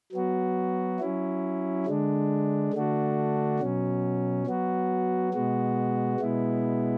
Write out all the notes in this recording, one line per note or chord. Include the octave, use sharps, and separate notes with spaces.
F#3 B3 F#4
F#3 C#4 E4
D3 G#3 D4
D3 A3 D4 F#4
B2 F#3 C#4
F#3 B3 F#4
B2 G#3 B3 F#4
B2 G#3 B3 E4